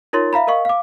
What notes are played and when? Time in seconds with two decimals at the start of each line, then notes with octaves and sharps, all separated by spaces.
0.13 D#4 F4 A#4 C#5 C6 A6
0.33 E5 F5 A#5 B5
0.47 A#4 D#5 F5 C#6
0.65 F5 D6